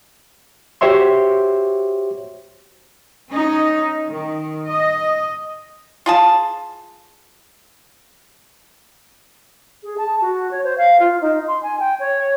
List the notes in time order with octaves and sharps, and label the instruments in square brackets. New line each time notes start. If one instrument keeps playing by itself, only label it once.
[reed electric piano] F#4 G4 C5 C#5 E5 C6
[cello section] C#4 D#4
D#3
D#5
[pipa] F4 G#4 A5
[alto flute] G#4
A5
F#4
C#5
C5
F5
F4
D#4
C6
G#5
G5
C#5